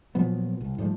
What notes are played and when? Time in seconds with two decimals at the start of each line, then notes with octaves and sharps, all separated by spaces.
0.15 A#2 F3 F#3 B3
0.61 C2
0.78 G#2 F3 G3 A3